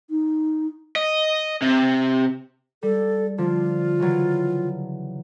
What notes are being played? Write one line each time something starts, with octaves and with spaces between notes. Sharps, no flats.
D#4
D#5
C3
G3 A4
D3 F3 D4 F4
C#3 E3 F#3